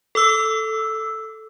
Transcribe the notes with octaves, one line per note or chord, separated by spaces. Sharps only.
A4 D6 E6